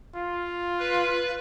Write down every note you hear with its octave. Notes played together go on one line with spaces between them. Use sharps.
F4
B4